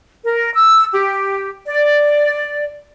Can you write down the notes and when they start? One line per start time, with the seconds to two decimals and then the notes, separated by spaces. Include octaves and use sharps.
0.22 A#4
0.52 E6
0.91 G4
1.64 D5